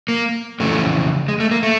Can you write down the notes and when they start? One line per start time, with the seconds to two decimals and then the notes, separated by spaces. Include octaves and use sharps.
0.08 A#3
0.60 F2 C#3 E3 A3
1.28 G#3
1.40 A3
1.51 A#3
1.63 A3